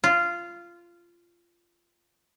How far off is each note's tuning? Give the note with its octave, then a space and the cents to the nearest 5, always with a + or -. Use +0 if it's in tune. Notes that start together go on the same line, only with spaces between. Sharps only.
F4 -15